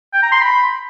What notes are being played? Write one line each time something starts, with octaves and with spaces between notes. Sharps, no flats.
G5
A#5
C6
B5